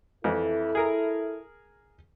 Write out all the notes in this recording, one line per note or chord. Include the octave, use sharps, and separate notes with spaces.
F2 E3 E4 A4
G#4 A#4 A#5